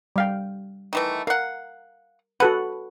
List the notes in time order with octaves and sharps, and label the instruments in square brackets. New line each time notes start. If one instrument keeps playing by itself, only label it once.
[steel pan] G3 F5 G5
[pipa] D#3 E3 A3
[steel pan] A#4 [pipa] F5 F#5
[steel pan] F#4 A4 F#5 [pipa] B4